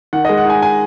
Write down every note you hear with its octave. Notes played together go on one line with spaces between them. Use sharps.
D#3 F#5
D#5
G#3
F#5
D#4 G#5
G#5